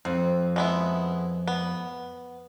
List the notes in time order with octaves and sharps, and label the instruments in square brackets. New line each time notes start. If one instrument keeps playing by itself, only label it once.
[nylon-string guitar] F2 [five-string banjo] C4
[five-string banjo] G#3 B3 E4
B3